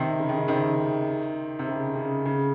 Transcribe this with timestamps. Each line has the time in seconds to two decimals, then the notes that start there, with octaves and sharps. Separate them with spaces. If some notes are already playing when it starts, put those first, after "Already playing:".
Already playing: C3 D#3
0.19 C#3
0.29 D#3
0.37 C#3
0.48 C3 D#3
1.59 C3
1.67 C#3
1.96 C#3
2.25 C#3